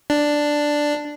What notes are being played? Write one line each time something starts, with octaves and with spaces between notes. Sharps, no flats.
D4